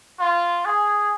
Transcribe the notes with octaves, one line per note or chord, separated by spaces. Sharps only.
F4
G#4